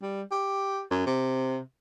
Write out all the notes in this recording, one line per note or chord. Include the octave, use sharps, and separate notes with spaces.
G3
G4
F#2
C3